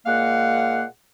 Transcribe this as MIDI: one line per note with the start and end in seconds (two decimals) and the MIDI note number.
0.06 0.85 46
0.06 0.85 56
0.06 0.85 58
0.06 0.85 77
0.06 0.85 78